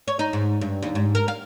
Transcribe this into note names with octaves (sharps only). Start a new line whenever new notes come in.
C#5
D#4
G#2
G2
D#2
G#2
A#4
F5